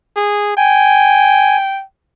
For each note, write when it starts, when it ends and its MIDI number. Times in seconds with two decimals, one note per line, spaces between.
0.17 0.55 68
0.57 1.84 79
0.57 1.57 80